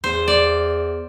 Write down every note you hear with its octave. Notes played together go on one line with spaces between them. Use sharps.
E2 C5
D5